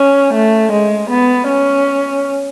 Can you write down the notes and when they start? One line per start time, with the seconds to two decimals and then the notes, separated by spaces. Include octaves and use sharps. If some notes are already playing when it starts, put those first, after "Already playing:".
Already playing: C#4
0.34 A3
0.72 G#3
1.10 B3
1.48 C#4